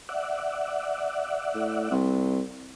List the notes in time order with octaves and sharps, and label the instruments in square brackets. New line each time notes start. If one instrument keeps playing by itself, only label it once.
[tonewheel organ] D5 E5 F#5
[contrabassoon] A2
C2